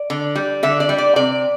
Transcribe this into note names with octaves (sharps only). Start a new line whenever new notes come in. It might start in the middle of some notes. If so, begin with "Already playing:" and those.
Already playing: D5
D3
G3
D3 E5
D5
G3
D5
C3 D5